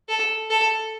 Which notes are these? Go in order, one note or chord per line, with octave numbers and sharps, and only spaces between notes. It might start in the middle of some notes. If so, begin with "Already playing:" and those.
A4
A4